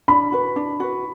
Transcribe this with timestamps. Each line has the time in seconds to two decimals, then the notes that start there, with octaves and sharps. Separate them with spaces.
0.08 D4 B5
0.32 F#4 B4
0.56 D4
0.80 F#4 B4